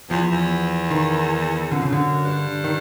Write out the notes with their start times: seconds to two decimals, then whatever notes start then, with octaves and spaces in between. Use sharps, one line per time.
0.10 E2 F3
0.31 E2
0.91 D#3
1.72 F2 D3
1.82 C#3
1.93 F#2 D3
2.25 G2
2.64 D#3